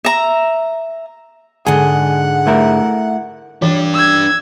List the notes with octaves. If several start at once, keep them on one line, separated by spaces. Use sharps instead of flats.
E5 A#5
G#2 D3 G#3 G#4 F#5
A3 E4 A#4
E3 D4 G4
E6 G#6